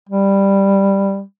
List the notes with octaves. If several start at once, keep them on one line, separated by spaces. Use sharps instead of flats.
G3